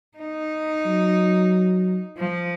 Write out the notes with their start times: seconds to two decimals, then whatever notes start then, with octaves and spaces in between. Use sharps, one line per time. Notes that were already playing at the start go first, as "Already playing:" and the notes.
0.18 D#4
0.85 F#3
2.18 F3